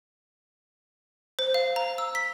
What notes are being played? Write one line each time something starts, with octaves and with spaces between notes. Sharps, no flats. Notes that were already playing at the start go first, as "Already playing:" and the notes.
C5
F5
A#5
E6
B6